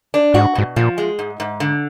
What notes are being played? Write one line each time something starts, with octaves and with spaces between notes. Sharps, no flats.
D4
G#2 F#4
G#2 B2
A#2 F3
G#3
G#2
G#2
D3